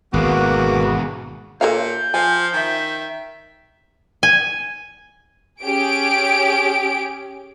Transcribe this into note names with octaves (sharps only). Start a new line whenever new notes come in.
G#1 B2 G#3 A#3 F#4 B4 D6
A#2 A4 C#5 F5 G6
F3 G#5
D#3 E5
G#5
C#4 G4 G#4 D7